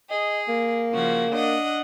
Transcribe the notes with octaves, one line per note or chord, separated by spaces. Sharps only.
G#4 D#5
A#3
C#3 F3 F#4
D4 D#5 F#5